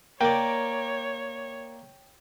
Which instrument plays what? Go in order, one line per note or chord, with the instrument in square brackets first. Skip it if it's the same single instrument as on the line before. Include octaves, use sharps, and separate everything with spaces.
[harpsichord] A#3 D5 [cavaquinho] A#4 [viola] C#5 [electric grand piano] G5